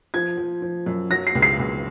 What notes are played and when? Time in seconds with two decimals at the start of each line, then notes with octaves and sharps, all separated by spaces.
0.14 F3 G#6
0.37 F3
0.62 F3
0.86 F#2
1.10 F#3 A#6
1.27 C7
1.35 C#2
1.42 C7
1.59 C#2